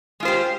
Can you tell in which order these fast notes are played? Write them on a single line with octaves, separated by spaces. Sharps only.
G#3 F4 C5 G4